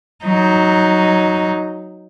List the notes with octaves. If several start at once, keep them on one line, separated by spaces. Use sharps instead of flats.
F#3 D#4